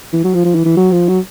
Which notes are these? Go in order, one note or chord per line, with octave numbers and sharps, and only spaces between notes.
E3
F#3
F3
F3
E3
E3
F#3
F3
F#3